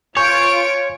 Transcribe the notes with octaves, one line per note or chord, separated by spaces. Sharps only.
F4 C#5 G#5 C#6 G6 D7